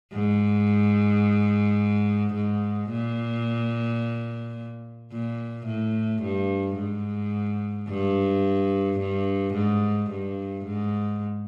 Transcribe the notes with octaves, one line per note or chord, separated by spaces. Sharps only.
G#2
G#2
A#2
A#2
A2
G2
G#2
G2
G2
G#2
G2
G#2